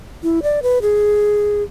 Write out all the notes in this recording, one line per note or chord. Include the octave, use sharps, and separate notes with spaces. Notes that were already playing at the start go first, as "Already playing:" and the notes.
E4
D5
B4
G#4